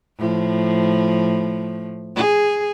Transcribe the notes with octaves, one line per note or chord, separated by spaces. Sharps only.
A2 F3
G#4